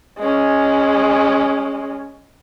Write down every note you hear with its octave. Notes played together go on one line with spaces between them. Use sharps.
G#3 C#4